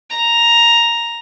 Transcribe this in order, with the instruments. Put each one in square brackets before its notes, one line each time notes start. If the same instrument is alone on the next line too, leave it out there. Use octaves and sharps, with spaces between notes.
[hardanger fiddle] A#5